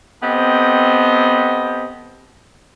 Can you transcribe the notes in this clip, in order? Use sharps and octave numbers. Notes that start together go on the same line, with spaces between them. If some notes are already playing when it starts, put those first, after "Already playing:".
B3 C4 G4 A4 D#5